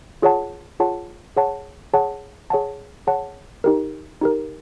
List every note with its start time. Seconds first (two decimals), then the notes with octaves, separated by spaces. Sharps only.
0.22 F4 G#4 C#5 F#5 A5
0.80 F4 G#4 C#5 F#5 A5
1.37 G#4 C#5 F#5 A5
1.94 G#4 C#5 F#5 A5
2.50 G#4 C#5 F#5 A5
3.07 G#4 C#5 F#5 A5
3.64 D#4 G4 A#4
4.21 D#4 G4 A#4